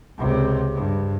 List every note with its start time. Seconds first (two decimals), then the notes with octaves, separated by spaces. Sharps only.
0.18 C#2 C3
0.74 G2